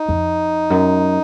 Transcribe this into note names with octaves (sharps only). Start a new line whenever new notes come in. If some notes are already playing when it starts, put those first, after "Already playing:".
Already playing: D#4
F2
F#2